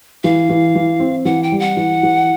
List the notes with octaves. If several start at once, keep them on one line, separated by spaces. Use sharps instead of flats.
E3 F5
E3
E3
C4
E3 F#5
G5
G3
F#5
E3
E3